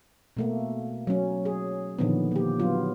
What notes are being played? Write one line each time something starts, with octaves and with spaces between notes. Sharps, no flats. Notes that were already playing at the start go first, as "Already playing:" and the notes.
B2 A3 A#3
F#3 C#4
G#4
A#2 D3 D#3 F3 B3
A#3 G4
F#3 B3 F4